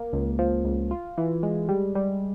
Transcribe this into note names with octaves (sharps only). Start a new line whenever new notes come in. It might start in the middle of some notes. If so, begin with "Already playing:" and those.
Already playing: A#3
C#2
F3
C#2
F4
E3
G#3
G3
G3